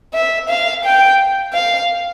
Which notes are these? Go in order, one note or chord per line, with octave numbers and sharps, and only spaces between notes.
E5
F5
G5
F5